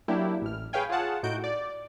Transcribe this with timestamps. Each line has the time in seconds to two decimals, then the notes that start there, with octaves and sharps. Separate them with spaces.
0.08 F#3 A#3 D4 E4 G4
0.42 A1 F6
0.73 G#4 B4 C#5 F5 G5 G#5
0.89 F4 G#4 C#5 F5 F#5 A5
1.23 A2 D#4 F#4 G6 D7
1.44 D5